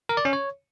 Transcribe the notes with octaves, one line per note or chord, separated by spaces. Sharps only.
A#4
D5
C#4
C#5